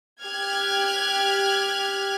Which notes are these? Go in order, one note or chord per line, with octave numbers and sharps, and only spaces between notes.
G4 F6 F#6 G#6